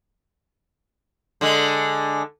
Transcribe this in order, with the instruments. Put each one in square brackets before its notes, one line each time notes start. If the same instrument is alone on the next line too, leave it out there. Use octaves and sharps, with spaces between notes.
[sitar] D3 G#3